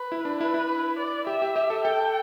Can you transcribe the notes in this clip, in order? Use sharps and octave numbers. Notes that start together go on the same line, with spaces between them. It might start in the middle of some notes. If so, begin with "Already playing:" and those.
Already playing: B4
E4
D4
E4 B4
E4
D5
G4 E5
G4
G4
A4
A4 G5